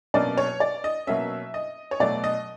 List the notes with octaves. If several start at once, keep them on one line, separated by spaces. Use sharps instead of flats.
B2 F#3 A#3 C#4 D5
C#5
D5
D#5
B2 F#3 A#3 C#4 E5
D#5
C#5
B2 F#3 A3 D5
D#5